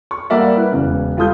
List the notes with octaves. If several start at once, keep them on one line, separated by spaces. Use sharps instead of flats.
C#6
G3 A#3 D5 E5 F#5
E4 B4 F#6
E1 C#3
G3 F4 A4 D#6 G6